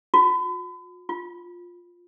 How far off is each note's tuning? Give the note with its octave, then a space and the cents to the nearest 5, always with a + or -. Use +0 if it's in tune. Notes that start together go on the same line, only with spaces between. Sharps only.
F4 +45
F4 +10